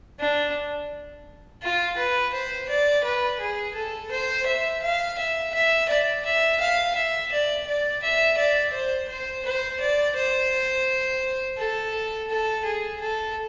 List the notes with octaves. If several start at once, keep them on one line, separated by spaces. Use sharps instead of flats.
D4
F4
B4
C5
D5
B4
G#4
A4
C5
E5
F5
E5
E5
D5
E5
F5
E5
D5
D5
E5
D5
C5
C5
C5
D5
C5
A4
A4
G#4
A4